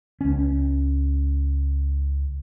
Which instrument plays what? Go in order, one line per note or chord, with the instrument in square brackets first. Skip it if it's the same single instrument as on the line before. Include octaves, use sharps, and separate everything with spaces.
[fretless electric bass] C#2 C#4